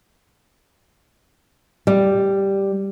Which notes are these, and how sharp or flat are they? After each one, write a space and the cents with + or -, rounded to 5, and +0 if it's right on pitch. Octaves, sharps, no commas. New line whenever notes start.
G3 +0